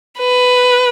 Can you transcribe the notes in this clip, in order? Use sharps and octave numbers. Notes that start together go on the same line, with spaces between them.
B4